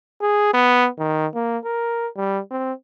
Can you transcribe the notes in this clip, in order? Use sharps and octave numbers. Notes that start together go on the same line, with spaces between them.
G#4
B3
D#3
A#3
A#4
G3
C4